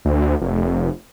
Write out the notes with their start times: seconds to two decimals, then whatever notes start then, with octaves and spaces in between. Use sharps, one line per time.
0.05 D2
0.41 F1